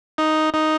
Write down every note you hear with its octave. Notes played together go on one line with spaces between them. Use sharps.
D#4
D#4